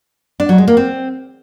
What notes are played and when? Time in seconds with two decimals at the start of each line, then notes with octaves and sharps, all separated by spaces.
0.40 D4
0.49 F#3
0.58 G#3
0.68 A#3
0.77 C4